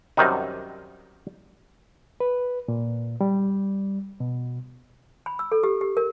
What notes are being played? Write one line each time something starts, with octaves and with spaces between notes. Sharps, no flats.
F#2 C3 D#3 G3 D#4
B4
A#2
G3
B2
B5
E6
A4
G4
G4
A#4